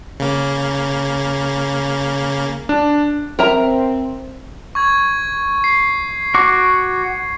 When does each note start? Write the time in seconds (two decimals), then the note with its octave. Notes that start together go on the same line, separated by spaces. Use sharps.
0.20 C#3 A#3
2.69 D4
3.39 C4 A#4 E5 A#5
4.75 C#6 G#6
5.64 C7
6.34 F#4 C#6 D6